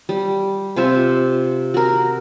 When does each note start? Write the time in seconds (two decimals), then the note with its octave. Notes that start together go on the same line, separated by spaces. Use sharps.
0.09 G3
0.76 C3 F4 C5 E5
1.74 F#4 A#4